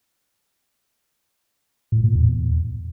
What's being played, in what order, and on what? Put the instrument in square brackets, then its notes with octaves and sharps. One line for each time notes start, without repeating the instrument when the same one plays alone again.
[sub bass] A2
A#2
E2